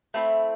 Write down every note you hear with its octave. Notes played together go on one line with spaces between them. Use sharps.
A3 C4 E4